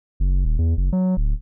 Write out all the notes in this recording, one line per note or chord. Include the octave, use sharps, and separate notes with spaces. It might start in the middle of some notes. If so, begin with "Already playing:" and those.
F#1
D#1
E2
F#1
F#3
D1